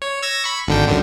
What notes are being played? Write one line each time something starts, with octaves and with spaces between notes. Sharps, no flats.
C#5
E6 G#6 A#6
B5 C#6
G#1 D3 G5
C#2 F#2 D3